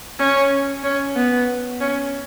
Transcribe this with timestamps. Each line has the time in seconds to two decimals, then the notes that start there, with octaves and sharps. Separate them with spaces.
0.19 C#4
0.84 C#4
1.16 B3
1.81 C#4